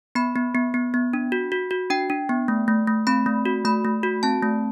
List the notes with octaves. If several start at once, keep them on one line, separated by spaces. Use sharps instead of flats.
B3 B5
B3
B3
B3
B3
D4
F#4
F#4
F#4
D4 G5
D4
B3
A3
A3
A3
C4 B5
A3
F#4
A3 B5
A3
F#4
C4 A5
A3